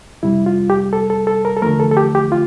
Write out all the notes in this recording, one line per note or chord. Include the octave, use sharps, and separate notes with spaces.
F2 C3 G3 E4
F4
G4
A4
A4
A4
A#4
A4
E2 D3 F3 A3 A#4
A4
A4
G4
G4
F4